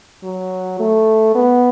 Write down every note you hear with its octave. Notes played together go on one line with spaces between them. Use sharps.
F#3
A3
B3